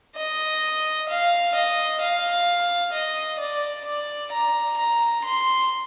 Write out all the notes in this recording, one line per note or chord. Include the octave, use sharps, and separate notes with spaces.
D#5
F5
D#5
F5
D#5
D5
D5
A#5
A#5
C6